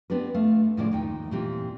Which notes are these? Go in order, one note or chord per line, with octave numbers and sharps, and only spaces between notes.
B3 C4 D4 G4 B4
A3 F5
A2 C#3 F3 G#3 D5
D#2 D#4 G5
A#2 E3 C4 F4 G4